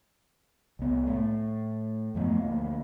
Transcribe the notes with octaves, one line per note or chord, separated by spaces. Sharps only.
C2 B3
A2 A3
F#2 F3 A3 B3
D2 A#3